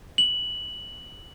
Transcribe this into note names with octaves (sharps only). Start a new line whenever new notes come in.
F#7